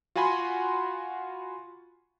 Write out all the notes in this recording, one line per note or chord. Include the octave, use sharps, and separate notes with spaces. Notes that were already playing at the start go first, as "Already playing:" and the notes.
F4 F#4 F#5 G#5 B5 C6